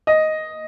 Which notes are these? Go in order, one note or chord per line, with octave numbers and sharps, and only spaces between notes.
D#5